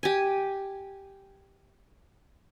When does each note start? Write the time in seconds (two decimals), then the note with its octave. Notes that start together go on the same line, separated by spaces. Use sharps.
0.03 G4 G#5